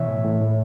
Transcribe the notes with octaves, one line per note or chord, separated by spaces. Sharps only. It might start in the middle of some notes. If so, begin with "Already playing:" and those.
Already playing: B2 E3 C#5 E5
A2
A2
A2